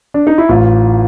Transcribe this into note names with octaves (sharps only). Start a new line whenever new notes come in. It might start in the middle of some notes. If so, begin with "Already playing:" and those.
D4
D#4
E4
A1 F4